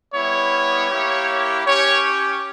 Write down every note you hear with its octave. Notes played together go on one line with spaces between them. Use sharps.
G3 B3 E4 C#5
A#3 E4 G4
C#4 G4 C#5